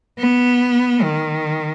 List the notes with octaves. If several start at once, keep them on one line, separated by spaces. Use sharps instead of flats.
B3
D#3